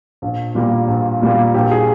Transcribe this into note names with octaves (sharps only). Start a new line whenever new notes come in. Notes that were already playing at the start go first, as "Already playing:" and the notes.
A#1
A#2 G3 A#3
A#1
A#2 G3 A#3
A#1 G4
G#4